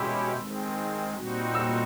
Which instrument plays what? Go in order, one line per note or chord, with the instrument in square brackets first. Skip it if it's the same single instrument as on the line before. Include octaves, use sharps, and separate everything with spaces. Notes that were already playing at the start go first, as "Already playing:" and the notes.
Already playing: [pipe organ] B2 G#3 C#4 E4 G4 [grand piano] B5 C6 E6
[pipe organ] D#3 G#3 C4
A#2 G3 C4 D#4 F#4
[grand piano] E6